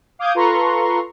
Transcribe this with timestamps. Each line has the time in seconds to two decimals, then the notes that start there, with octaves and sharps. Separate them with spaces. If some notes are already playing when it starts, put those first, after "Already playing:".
0.19 F5 D6 D#6 G6 G#6
0.34 F4 A4 B4 A#5 C6 C#6